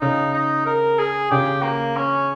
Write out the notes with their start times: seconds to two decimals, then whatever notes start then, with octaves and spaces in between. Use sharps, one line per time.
0.01 C#3 D#4
0.34 D#4
0.66 A#4
0.99 G#4
1.31 C#3 G4
1.63 A#3
1.96 C#4